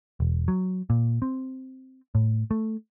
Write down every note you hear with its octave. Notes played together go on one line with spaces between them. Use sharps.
E1
F#3
A#2
C4
A2
A3